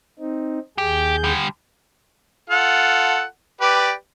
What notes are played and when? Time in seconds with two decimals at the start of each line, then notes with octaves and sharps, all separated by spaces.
0.19 C4 D#4
0.78 D#2 G4 G#4 G6
1.24 D3 G3
2.50 F4 A4 F#5
3.61 G4 B4 D5